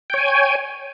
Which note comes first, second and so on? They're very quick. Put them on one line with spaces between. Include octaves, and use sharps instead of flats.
G5 C#5 G#5